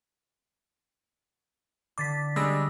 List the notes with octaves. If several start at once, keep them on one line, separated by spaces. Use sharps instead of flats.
D3 D6 A6 B6
G3 G#3 D4 D#6 E6 A#6